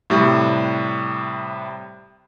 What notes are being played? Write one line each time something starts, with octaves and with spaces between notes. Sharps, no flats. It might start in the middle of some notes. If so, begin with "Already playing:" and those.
A2 C3 G3